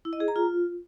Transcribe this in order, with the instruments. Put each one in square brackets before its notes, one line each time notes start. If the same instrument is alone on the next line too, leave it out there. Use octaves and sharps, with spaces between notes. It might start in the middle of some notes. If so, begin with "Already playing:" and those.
[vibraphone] E4
D#5
G#4
A#5
F4